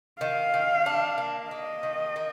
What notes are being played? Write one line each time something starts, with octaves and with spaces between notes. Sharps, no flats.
D#3 F5
D#3
D4
A#3
A#3 D#5
D#3
A#3